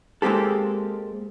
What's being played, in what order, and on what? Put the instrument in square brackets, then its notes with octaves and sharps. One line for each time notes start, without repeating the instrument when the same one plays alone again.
[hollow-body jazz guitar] G#3 A#3 C4 G4 A4